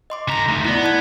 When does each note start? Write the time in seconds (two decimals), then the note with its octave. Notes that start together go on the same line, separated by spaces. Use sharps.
0.10 D#5 C6 D6
0.29 D3 A#5 A#6 B6
0.48 A3 D#4
0.65 B3 E4 D5
0.84 A5 F#6 G#6